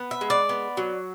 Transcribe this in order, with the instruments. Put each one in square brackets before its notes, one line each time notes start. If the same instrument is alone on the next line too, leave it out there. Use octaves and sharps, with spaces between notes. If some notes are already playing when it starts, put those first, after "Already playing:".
Already playing: [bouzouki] B3
E5
G#3
D5
B3
F#3